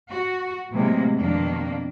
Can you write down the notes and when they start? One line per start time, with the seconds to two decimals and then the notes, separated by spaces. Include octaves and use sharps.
0.11 F#4
0.72 A2 C3 E3 F#3 G#3 A#3
1.17 F2 B2 D#3 A#3 D4